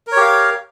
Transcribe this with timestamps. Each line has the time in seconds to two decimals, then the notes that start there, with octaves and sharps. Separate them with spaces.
0.07 A#4
0.12 C#5
0.16 G4
0.21 F5